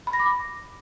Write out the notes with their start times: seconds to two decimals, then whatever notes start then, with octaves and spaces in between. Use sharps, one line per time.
0.07 B5
0.13 A#6
0.20 D6